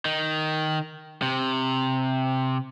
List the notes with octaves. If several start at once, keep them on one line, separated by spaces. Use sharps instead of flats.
D#3
C3